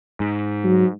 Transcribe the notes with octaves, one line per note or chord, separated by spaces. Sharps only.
G#2
F#3